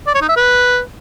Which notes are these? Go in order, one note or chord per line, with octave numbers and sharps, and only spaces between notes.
D5
C#5
D#4
E5
B4